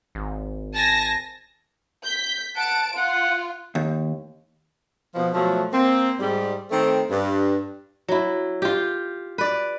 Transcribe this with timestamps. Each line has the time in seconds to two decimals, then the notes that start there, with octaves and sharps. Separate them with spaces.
0.15 G#1
0.75 G#5 A5 A#6
2.03 G6 B6
2.56 F#5 A5 D7
2.96 F4 F#5
3.75 D#2
5.15 B2 F3
5.34 B2 F3 F#3 A3
5.72 A#3 C4
6.20 G#2 G3
6.70 D#3 A3 C4
7.10 G2
8.08 F#3 E4
8.62 F4 G4
9.38 B4 D5